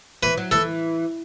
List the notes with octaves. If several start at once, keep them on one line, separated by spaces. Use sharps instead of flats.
E3 B4
F#3
E3 A4